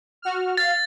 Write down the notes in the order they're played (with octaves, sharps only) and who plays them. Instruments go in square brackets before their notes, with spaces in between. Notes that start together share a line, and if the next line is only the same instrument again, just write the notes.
[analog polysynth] F#4 F6
[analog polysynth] F5 [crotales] A6